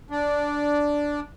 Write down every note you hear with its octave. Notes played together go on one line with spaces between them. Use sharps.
D4